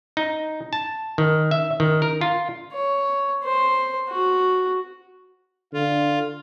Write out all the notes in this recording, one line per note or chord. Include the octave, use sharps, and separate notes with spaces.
D#4
A5
D#3
E5
D#3
A#4
F4
C#5
C5
F#4
D3 F4